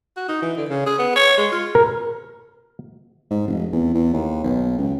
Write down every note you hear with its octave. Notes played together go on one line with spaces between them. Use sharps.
F#4
D#4
E3
D3
C#3
G#4
B3
C#5
G#3
F4
A#4
G#2
F1
E2
E2
D#2
B1
C#2